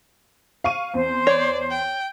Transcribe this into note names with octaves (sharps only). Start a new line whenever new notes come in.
F5 C#6 D#7
E2 C4 C5
C#5 D5
G5